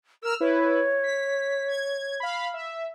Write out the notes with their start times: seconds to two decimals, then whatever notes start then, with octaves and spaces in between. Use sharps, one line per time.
0.23 A#4 E6 F6
0.40 E4 B4 C#5
1.04 B6
1.68 G#6
2.20 F5 B5
2.54 E5